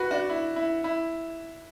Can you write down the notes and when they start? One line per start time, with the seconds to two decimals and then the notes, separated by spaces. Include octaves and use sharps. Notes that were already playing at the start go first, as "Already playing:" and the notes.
Already playing: F#4 B4
0.11 D4 F#4
0.29 E4
0.56 E4
0.84 E4